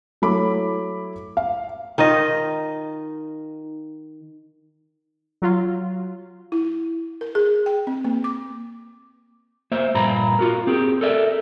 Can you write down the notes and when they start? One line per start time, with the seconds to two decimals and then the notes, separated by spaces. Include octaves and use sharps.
0.22 F#3 A3 E4 B5 D6
1.37 F5
1.98 D#3 D#4 F4 D#5
5.42 F#3 F4
6.52 E4
7.21 A#4
7.35 G#4
7.66 G5
7.87 C4
8.05 A#3
8.24 D6
9.72 A#3 C5 E5
9.94 G2 A#2 A#5 B5
10.39 F4 F#4 A#4
10.67 C4 G4 G#4
11.01 A4 A#4 D5 E5